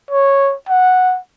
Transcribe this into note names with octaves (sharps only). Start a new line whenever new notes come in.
C#5
F#5